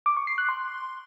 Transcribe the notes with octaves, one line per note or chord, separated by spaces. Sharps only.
D6
C#6
C7
F#6
C6